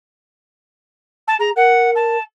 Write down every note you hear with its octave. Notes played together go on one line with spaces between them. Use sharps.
A5
G#4 A#5
A#4 F#5
A5